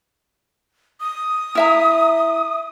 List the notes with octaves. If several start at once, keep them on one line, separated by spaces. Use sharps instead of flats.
D#6
E4 E5 A#5